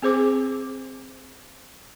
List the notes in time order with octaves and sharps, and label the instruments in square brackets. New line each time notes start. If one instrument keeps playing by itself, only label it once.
[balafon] C4 G#4 C5 D6